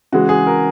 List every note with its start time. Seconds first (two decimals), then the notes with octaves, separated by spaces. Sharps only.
0.12 C#3 E3 G#3 F#4
0.29 G#4
0.46 A#4